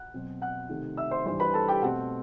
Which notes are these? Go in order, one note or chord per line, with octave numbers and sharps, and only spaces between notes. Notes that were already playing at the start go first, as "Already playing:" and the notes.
Already playing: F#5 F#6
B2 F#3 C4
F#5 F#6
C3 D#3 A3 C4
E5 E6
C5 C6
G2 E3 G3 C5 C6
B4 B5
A4 A5
G4 G5
B2 A3 C4 F#5